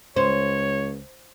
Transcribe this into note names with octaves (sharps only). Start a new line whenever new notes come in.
C#2 C5 C#5